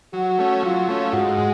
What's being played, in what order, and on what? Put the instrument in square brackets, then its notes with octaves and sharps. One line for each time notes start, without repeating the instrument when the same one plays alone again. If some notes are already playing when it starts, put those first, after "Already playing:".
[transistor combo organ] F#3 [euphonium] F#4
[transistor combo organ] A3 C#4
[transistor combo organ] F#3 [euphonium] F4
[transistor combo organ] A3 C#4
[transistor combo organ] G#2 [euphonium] F#4
[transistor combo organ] G#3